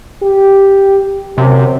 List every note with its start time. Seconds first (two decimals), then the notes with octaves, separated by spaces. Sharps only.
0.22 G4
1.38 F#2 C3